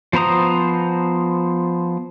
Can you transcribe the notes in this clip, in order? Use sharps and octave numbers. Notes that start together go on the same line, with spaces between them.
F3 B3 C5 A#5 D#6